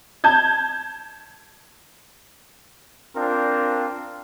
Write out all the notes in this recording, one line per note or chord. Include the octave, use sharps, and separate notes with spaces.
A5 G6 G#6
C4 D4 F4 A#4 C5